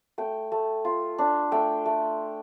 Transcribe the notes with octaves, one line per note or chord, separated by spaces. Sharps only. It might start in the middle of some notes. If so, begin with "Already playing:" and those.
A3 G5
A3
F4
D4
A3 G5
A3